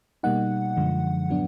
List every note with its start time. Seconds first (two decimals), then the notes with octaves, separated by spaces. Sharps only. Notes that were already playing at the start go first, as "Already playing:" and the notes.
0.23 B2 G3 A#3 D#4 F#5
0.77 F#2 D3 F3 G#3
1.29 A2 F#3 B3 D4